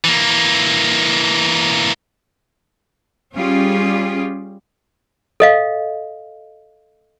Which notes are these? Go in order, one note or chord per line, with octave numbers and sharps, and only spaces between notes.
E3 A#3
G3 C#4 F4 G4 G#4
A4 D#5 F5